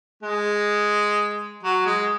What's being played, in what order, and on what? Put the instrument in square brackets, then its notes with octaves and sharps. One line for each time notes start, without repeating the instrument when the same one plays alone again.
[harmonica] G#3
F#3
G#3